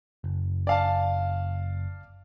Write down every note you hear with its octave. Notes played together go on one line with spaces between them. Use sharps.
F#1
D5 F5 A5